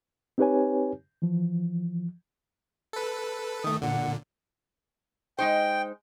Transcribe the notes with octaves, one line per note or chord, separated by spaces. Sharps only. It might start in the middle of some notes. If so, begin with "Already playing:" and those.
C4 D#4 G4 B4 C#5 G#5
E3 F3
A4 B4
D#3 A3 D#6
A#2 D3 F#5
G#3 D#4 C5 G5